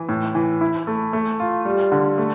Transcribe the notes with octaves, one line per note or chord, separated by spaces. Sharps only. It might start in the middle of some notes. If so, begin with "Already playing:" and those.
Already playing: E3
A2
E3
E4
A3
A3
F4
G3
D3
A3